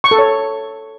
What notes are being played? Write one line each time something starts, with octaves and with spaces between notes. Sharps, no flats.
C#6
A4
C#5